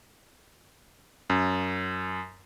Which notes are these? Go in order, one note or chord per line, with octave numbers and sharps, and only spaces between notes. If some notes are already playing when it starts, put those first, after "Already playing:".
F#2